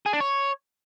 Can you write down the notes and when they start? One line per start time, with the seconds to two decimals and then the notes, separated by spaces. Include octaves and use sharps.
0.06 G#4
0.13 D4
0.20 C#5